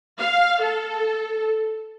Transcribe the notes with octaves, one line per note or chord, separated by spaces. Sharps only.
F5
A4